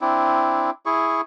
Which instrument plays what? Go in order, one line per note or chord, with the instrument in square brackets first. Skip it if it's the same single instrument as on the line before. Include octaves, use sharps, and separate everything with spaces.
[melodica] C4 D4 E4
E4 G#4 C#6